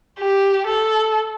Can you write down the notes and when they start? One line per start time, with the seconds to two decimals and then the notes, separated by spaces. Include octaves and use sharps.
0.20 G4
0.67 A4